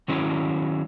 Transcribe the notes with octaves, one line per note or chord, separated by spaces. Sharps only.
D#3 F#3 G#3 C#4 E4